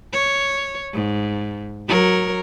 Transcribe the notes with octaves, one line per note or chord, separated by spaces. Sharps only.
C#5
G#2
F#3 A#4 C#5